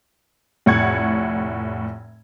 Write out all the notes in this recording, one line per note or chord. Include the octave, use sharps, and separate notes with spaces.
F1 A2 F#5 C#6 G#6